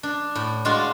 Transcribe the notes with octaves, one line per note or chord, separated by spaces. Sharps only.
D4
A2
G#3 D4 F4 F#4